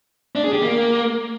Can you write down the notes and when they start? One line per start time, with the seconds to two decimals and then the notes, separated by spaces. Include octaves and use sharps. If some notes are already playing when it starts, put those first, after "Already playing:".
0.35 D4
0.44 G#4
0.53 G4
0.62 A#3